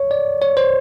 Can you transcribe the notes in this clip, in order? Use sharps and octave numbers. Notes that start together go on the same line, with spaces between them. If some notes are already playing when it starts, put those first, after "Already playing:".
Already playing: C#5
D5
C#5
C5